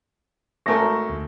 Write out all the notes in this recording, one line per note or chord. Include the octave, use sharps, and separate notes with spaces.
G#1 A3 A#4 C#6 A#6
D2